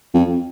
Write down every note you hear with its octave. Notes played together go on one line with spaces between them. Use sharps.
F2